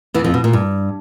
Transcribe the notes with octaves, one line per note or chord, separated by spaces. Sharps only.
E2 E3
F2 F3
B2
A#2
G2